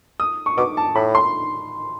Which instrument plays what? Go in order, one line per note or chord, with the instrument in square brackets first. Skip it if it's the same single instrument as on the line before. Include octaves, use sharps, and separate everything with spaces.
[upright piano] D#6
C#6
[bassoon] B2 [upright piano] D6
[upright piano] A5
[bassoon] A2 [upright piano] B5
[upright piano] C6